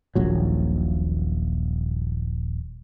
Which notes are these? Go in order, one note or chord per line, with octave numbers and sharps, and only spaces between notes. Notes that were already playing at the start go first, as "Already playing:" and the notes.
D#1 A#1 F#3